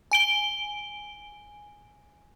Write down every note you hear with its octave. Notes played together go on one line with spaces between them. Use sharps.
G#5 D7 G7